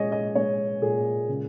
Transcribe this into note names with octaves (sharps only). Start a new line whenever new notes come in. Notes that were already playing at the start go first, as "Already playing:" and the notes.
Already playing: A#2 G#3 G#4 C#5 D#5
D#5
G#3 C#5
A#2 G#4
C#3